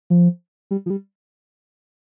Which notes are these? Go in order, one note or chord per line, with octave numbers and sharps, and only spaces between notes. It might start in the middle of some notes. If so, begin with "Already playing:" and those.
F3
G3
F3
G3